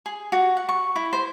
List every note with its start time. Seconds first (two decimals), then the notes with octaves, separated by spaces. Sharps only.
0.06 G#4
0.32 F#4
0.57 F#5
0.69 C#6
0.96 E4
1.13 C5